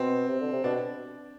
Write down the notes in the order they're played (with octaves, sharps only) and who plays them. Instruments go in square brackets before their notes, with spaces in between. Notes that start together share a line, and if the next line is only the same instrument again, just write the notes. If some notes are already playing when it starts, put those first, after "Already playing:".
Already playing: [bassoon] B2 [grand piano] C4
[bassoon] C3
D3
C3
[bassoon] B2 [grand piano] D4